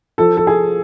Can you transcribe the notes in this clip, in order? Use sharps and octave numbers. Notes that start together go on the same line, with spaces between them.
F3 A4
A4
G#4